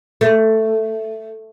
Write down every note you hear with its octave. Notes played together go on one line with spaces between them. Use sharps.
A3